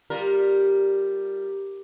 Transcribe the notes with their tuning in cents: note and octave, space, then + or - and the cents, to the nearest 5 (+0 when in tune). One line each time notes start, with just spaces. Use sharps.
G3 +0 F4 +0 A#4 +0